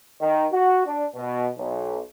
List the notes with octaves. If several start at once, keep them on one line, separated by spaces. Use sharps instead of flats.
D#3
F#4
D4
B2
B1